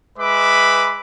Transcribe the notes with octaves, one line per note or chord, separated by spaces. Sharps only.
G#3 B4 E5 B5 D6